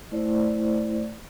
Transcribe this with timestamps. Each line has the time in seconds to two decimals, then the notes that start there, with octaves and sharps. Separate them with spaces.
0.11 A3 E4 C5 D5